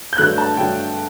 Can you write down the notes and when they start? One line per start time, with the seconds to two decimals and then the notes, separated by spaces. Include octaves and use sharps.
0.13 G6
0.18 G2 D3 F#3 A3 F#6
0.38 A5
0.56 G2 D3 F#3 A3 G5